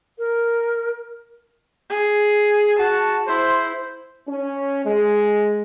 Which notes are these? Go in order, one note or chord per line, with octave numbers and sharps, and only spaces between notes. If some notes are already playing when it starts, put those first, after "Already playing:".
A#4
G#4
F#4 A5
E4 C5
C#4
G#3